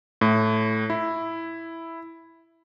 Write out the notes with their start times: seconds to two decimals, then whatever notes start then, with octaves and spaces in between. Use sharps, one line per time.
0.21 A2
0.90 E4